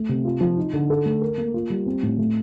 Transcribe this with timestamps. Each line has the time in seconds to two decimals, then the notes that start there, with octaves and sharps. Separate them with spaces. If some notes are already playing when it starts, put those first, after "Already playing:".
Already playing: A3
0.09 C3
0.25 F4
0.41 F3
0.57 D#4
0.73 D3
0.90 A4
1.06 A3
1.21 A#4
1.38 A#3
1.54 F4
1.70 G3
1.86 C4
2.03 A2
2.18 A3